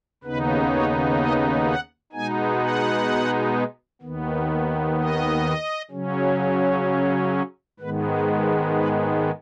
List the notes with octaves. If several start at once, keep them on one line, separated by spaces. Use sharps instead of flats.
D#2 C#3 B3 D#4 B4
C#5
D#5
F#5
B2 G#3 B3 D#4 G#5
F#5
D#2 D#3 B3
D#5
C#3 F#3 C#4
G#2 D#3 G#3 B3 B4
B4
G#4
B4